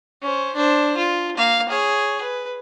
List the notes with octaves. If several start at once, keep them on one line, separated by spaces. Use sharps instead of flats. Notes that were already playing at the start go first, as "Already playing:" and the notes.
C#4 C5
D4 C5
F4
A#3 F5
G#4 C#5
B4